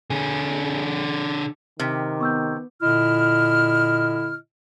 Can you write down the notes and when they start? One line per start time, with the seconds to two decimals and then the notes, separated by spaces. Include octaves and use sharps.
0.10 D3 G#4
1.80 C3 D#3 G5 F6
2.20 B3 C#6 E6 G6
2.81 A#2 D3 E4 D#5 F6